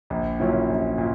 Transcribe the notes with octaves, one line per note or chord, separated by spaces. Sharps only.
A#1
A#2 F#3 C#4 E4
A#1
A#2